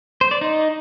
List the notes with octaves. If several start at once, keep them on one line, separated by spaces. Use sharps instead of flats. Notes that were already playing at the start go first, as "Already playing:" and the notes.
C5
D5
D#4